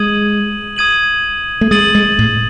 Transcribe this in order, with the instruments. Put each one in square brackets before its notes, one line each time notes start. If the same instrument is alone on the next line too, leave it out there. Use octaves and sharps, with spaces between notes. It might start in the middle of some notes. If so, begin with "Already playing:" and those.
Already playing: [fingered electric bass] G#3 [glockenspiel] D#6 G#6 D#7 F#7
[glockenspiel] D#6 G#6 D#7 F#7
[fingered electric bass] A3
[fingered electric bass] G#3 [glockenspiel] D#6 A6 D#7 F#7
[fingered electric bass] G#3
A2